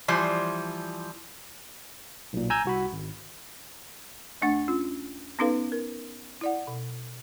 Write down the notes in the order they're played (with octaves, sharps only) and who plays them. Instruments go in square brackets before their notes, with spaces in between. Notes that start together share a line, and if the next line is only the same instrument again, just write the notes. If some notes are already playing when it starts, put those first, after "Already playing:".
[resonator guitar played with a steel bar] E3 F3 G3 C5
[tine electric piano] B1 A#2
G#5 A#5 E6 G6 G#6
C2 F#4 B5
G#1
[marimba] D#2 A3 D4 F#5 A6
C#4 F4
B3 C#4 D#4 A4 B4 F5
A#4
E4 D5 F#5
B2